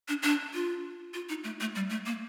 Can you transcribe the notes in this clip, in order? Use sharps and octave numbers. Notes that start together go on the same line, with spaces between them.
D4
D4
F4
F4
D#4
A3
A3
G3
A3
A#3